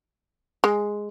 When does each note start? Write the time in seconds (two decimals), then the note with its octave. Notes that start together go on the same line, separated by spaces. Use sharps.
0.64 G#3